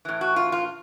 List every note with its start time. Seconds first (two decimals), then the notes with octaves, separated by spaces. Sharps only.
0.05 A2 E3
0.21 F#4
0.36 F4
0.52 F4